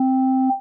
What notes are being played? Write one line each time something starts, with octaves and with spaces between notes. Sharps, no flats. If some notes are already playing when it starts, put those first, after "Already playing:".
Already playing: C4